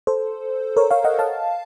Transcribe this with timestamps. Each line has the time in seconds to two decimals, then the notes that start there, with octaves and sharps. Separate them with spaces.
0.07 A4 C5
0.77 A#4 C#5
0.91 C#5 F5
1.04 D#5 F#5
1.19 F5 A5